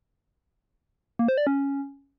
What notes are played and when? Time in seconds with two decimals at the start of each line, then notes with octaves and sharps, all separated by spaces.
1.19 A#3
1.28 C5
1.38 D5
1.47 C#4